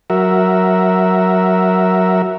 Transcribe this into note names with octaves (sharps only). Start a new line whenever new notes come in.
F#3 F#4 A#4 E5